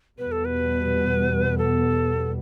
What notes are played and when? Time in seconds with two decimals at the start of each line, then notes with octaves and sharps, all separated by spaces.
0.19 E2 B2 G3 B3 B4
0.32 A4
0.45 B4
1.58 A4